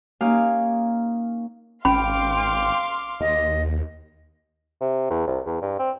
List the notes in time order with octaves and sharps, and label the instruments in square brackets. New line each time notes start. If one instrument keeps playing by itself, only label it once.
[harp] A#3 C#4 D#4 G4 F5 G#5
[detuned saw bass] G#1 [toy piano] C#4 B5 [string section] F5 C6 D6 [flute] G5
[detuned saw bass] D#2 [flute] D#5
[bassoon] C3
E2
C2
E2
G2
C4